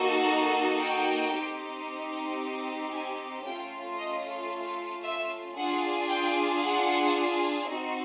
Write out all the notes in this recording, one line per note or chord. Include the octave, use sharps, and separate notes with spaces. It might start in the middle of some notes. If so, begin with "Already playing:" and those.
Already playing: A#3 D#4 F#4 A4
G5
C4 D#4 G4
G#5
A3 C#4 F4 G5
D#5
E5
D4 F4 G#4 F#5
G5
F#5
C4 D#4 F#4